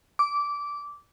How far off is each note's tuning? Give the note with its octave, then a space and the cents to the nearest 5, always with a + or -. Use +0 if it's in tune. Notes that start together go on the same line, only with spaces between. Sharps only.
D6 -15